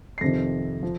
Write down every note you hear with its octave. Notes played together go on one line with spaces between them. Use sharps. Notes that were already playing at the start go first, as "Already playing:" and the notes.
C7
F2 C3 D#3 A#6
F3